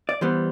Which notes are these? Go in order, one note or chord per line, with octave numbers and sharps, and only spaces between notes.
D5
E3 G3 B3 C5